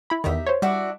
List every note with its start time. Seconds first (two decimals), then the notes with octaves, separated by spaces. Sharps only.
0.10 E4 B5
0.24 E2 D#3 D#4 G4 E5
0.46 C5 C#5
0.62 G3 D4 E4 F#4